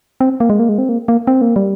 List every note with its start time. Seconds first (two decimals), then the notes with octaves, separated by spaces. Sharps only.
0.20 C4
0.40 A#3
0.50 G#3
0.59 A#3
0.69 G#3
0.78 C4
0.89 A#3
1.08 A#3
1.27 C4
1.41 A#3
1.56 G3